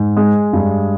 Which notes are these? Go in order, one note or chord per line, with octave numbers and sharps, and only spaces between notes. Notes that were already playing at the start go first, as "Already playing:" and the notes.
Already playing: G#2
G#3
G2